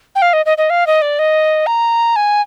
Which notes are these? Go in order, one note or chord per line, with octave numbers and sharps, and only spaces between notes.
G5
F5
D#5
D#5
D#5
F5
D#5
D5
D#5
A#5
G#5